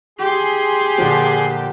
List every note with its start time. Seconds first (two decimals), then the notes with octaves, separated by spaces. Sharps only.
0.19 G4 G#4 C6
0.98 A#2 D3 F3